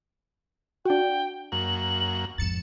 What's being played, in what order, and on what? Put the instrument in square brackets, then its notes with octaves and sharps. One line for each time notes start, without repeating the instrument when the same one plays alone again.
[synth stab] D4 F#4 [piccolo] G5
[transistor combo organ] F#2 A#3 [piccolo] F#7
[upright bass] F2 G#2 [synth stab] A6 C#7 E7